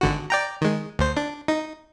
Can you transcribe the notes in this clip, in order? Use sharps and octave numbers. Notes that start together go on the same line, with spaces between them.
G#1 D3 F#4
D5 G5 A#5
D#3 G#3
D2 C5
D4
D#4